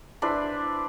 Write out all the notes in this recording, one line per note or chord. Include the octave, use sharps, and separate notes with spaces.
D4 E4 B4 C5